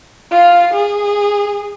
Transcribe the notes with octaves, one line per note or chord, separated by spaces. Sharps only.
F4 F5
G#4